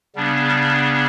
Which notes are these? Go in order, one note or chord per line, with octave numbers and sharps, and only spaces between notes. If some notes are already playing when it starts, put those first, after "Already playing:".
C#3 G3 B3 D4